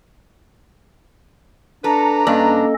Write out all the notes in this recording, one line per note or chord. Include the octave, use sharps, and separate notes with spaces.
D4 A4 B4 A#5
G2 A#3 C#4 D4 A4 D5 D#5